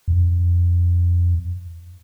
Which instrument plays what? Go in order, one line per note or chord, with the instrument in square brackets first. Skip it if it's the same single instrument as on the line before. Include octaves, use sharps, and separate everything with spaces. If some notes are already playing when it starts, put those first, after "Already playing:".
[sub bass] F2